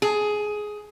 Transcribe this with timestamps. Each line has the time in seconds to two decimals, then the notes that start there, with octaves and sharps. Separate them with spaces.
0.02 G#4